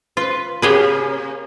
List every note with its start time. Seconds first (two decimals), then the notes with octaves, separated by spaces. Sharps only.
0.17 F4 B4
0.62 C3 A#3 C#4 G4 G#4 B4